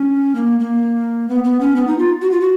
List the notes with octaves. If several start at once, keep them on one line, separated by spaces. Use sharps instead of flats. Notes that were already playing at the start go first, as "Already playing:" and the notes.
Already playing: C#4
A#3
A#3
B3
B3
C#4
B3
D#4
F4
F#4
F4
F#4